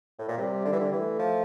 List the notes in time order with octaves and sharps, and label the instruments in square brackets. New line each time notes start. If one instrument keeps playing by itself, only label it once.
[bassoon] A2
A#2
[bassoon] C3 [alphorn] G3
[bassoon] D3
E3
D3
[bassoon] E3 [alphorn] A3
[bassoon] F3